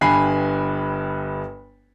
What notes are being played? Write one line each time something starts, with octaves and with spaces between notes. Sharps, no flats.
G1 G2 G#5 B5 C7